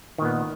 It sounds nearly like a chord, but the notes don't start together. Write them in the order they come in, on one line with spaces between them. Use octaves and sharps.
D#3 A#2 B3